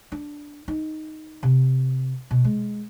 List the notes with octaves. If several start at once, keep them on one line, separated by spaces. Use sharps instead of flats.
D4
D#4
C3
B2
G#3